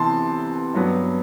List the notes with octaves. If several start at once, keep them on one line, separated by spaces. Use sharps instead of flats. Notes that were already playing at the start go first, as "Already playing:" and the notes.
Already playing: C3 E3 B3 A5 C6
G2 F#3 B3